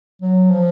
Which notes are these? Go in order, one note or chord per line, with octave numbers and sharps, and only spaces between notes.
F#3
F3